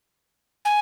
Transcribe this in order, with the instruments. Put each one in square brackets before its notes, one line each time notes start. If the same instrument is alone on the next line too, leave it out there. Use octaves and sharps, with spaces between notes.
[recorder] G#5